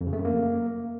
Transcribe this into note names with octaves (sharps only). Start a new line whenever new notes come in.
F2
C#3
A3
F#2
A#3